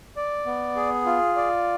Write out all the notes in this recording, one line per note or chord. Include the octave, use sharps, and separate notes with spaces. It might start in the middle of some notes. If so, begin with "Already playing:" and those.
D5
B3
G#4
F4
D5